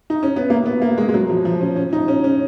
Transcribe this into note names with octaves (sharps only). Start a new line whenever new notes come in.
D#4
C#4
B3
A#3
B3
A#3
G#3
G#3
F#3
F3
F3
C#4
C#4
D#4
C#4
C#4